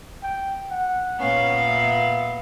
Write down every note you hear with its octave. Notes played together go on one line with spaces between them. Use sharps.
G5
F#5
A#2 B3 C#4 F5
E5